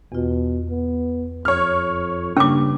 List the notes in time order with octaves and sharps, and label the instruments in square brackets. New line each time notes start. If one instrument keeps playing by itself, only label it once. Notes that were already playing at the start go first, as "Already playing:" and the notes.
[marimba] E2 F4 [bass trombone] B2
[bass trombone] B3
[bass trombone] F2 [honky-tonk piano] C#5 F6
[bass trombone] G2 [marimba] C#3 A#3 D4 [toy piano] C#4 D6